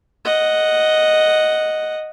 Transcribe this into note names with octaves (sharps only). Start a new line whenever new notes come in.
D#5 F#5